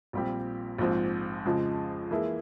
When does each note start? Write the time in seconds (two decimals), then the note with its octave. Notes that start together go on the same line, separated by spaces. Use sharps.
0.13 A#1 A#2 G3 C4 G4
0.78 A#1 G#2 F3 C4
1.45 F2 C#3 F3 G#3
2.11 E3 A#3 E4 G#4